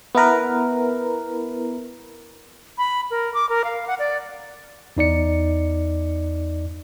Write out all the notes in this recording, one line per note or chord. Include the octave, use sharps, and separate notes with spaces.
B3 E4 A#4 B4
B5
A#4
D6
A#4
F5
F#5
D5
E2 D#4 D5 C#7